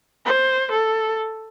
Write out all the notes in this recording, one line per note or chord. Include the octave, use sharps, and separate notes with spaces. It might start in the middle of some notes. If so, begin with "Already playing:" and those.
C5
A4